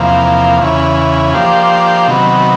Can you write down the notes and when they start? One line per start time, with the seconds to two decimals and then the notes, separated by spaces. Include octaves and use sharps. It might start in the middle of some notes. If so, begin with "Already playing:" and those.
Already playing: E2 C3 F3 A#3
0.61 E2 C#3 E3
1.33 F3 A#3 D4 G4 C5
2.07 C3 D#3 F#3 B3